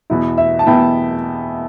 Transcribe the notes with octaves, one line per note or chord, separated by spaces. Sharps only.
E2 B2 B3 E4
E5
A5
E2 B2 B3 E4 G5